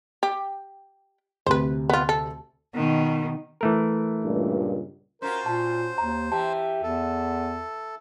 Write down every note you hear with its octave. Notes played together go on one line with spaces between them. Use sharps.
G4
D2 C3 B4 C5
B3 F4
A4
B2 D#3
E3 A3 A#4
C#2 G2 A#2
C#4 F4 F#4 A#4 C5
A#2 A5
D#2 A#5
E3 G4 A5
E2 A4